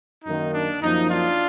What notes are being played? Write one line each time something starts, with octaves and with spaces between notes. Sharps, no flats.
F#2 D#3 A#3 D#4
D4
F#2 F3 A#3 D#4
D4 F4